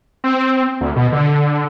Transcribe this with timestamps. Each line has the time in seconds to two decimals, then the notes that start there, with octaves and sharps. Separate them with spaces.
0.24 C4
0.81 D2
0.96 B2
1.12 D3